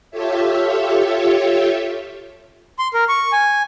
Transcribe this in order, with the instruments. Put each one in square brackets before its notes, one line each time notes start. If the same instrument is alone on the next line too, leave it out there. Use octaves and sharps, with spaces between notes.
[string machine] F4 G4 A4 C#5 E5
[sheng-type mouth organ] C6
A#4
C#6
G#5